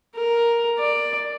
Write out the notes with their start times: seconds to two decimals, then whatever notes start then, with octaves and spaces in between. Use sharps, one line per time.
0.16 A#4
0.78 D5